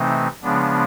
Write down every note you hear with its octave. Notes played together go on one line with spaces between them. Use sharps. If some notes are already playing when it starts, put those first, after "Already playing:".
Already playing: C3 E3 A3 C4 D#4
C#3 F3 G#3 B3 D4